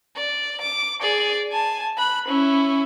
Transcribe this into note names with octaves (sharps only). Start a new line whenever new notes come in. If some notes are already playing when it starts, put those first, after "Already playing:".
D5
D6
G#4 D5
G#5 A5
B5 F#6
C#4 E4